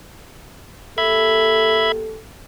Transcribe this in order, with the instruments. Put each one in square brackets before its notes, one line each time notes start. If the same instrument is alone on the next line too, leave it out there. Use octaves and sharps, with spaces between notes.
[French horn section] A#3 G4 A4 [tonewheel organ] E5 B5 G#6